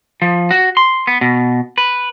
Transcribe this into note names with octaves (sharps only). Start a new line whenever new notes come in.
F3
F#4
C6
B3
B2
B4